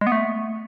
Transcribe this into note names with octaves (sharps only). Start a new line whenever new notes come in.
G#3
B3
A3